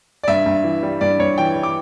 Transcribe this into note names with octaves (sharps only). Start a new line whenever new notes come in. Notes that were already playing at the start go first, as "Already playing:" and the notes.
D5
G2 E5
G2
E3
G3
G2 D5
G2 C#5
E3 G5
G3
D6